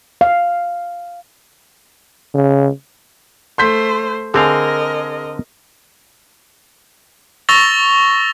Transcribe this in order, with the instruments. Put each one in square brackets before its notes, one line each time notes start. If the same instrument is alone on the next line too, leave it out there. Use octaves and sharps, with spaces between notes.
[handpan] F5
[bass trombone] C#3
[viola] A3 C5 [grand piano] C6 G6 B6
[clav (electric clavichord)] D3 C4 F5 [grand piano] G#4 [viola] A#4 D#5
[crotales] C#6 E6 A6 A#6 F7 G7